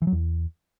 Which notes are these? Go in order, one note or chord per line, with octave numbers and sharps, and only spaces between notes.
E3
F#3
E2